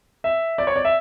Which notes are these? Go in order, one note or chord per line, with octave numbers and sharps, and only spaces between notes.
E5
D5
C#5
D5
E5